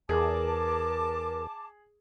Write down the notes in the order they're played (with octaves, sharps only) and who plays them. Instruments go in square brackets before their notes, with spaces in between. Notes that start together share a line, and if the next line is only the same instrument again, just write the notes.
[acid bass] E2 [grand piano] G#4 [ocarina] A#4 [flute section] A5 D6